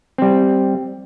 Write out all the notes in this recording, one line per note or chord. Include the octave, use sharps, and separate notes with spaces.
G3 C4